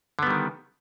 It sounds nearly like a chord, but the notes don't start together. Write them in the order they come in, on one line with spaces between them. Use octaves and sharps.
D3 B3 G3 D#3